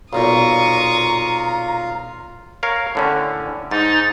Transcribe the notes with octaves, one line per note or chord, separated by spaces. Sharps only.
B1 G2 A#2 F4 F5 A#5 C#6 D#6
A#4 C#5 F5
A2 D3 C#4
G#2 D#4 A6